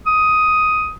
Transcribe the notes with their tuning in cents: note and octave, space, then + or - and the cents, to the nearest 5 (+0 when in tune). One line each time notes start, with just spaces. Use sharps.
D#6 +10